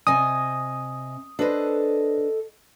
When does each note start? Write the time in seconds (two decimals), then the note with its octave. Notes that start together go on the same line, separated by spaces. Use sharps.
0.07 C3 D#5 G#5 D#6
1.39 D4 A4 B4 C5 D#5